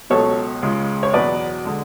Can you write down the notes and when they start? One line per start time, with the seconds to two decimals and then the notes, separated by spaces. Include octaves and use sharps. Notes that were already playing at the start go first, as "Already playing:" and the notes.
0.10 C#2 B2 F#3 A4 C#5
0.62 C#2 C#3 G#3
1.03 C#5
1.13 E2 B2 F#3 B4 D5
1.65 D3 G#3